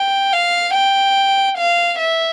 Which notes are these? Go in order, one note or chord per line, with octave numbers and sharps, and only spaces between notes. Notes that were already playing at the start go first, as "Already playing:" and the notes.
Already playing: G5
F5
G5
F5
E5